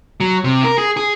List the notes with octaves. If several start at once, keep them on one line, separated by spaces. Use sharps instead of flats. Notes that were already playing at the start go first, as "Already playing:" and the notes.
F#3
C3
A#4
G#4
G#4